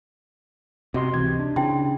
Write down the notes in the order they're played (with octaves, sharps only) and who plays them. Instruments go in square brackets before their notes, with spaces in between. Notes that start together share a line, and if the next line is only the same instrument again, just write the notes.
[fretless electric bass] C3 [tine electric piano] F#4 D#5 C6
[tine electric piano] C#2 E3 G#6 [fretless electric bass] C3
[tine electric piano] D4
[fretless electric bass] C#3 [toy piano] E4 G5 C6